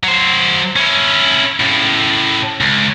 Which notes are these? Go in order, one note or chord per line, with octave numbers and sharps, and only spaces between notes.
F#3 C5
C#4 E4
A2 C#3
C#2